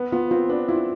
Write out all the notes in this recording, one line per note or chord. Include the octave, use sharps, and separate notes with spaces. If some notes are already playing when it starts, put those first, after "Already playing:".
Already playing: B3 B4
B3 F4
C4 F4
D4 B4
E4 F4